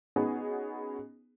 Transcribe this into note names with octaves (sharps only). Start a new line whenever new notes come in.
B3 C#4 D#4 F#4 G#4